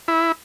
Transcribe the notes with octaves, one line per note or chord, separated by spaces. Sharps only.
E4